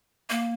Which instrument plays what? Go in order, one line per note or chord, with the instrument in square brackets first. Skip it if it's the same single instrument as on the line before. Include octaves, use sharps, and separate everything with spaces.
[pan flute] A#3